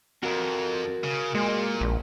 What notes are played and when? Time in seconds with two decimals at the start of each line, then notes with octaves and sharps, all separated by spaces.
0.23 F2 F#4 A#4
1.04 C#3
1.34 A#2 G#3
1.81 A#1